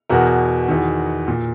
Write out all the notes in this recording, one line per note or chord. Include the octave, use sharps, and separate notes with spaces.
E2 B2 F#4 A#4
E2 D#3
A#2